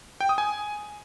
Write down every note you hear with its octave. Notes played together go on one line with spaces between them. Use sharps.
G5
D#6
G#5